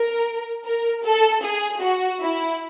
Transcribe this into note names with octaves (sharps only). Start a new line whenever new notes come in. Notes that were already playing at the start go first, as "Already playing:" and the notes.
Already playing: A#4
A#4
A4
G#4
F#4
E4